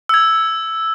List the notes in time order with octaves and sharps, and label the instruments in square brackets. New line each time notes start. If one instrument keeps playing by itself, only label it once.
[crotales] E6 G#6